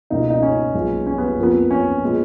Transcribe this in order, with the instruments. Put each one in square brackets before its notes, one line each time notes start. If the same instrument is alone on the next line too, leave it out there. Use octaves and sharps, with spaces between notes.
[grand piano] C#2 B2 A#3 D#4
D#4
C#4
B1 A#2 G#3 B3
C#4
B3
F2 F3 A#3 B3
C#4
A#2 G#3 B3